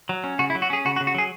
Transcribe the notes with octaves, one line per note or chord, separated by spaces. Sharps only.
F#3
C#4
C#3 F#4
E4
F#3
F#4
C#4 G#4
C#3 F#4
F#4
C#3
F#4
F#3 G#4